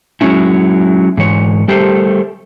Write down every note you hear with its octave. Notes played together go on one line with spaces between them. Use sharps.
F#3 G#3 C#4 E4
G#2 E3 C#5
G3 A3 G4 A4 A#4 C5